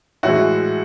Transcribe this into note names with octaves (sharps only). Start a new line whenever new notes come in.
A2 E3 G#3 E4 F#4